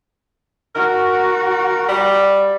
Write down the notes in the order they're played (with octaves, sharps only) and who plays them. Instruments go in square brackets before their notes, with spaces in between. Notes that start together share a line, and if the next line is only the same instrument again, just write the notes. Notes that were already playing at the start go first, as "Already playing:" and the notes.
[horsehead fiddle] F#4 [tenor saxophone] A#4
[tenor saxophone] G3